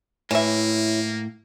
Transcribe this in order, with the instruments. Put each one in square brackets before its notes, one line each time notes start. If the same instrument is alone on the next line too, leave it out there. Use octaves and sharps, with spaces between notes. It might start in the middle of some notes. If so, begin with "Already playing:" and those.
[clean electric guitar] A2 [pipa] E3 E5 [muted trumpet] A#3 [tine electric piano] E4 C#5